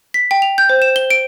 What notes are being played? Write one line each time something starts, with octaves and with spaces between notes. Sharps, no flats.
B6
G5
F7
G6
C5
E7
G7
D7